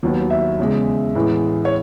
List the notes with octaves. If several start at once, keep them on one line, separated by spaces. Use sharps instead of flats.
D#2 D#3 F#3 B3
E5
E2 C#3 G#3
A2 E3 G#3 B3
C#5